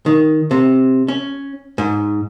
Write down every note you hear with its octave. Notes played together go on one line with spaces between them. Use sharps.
D#3
C3
C#4
G#2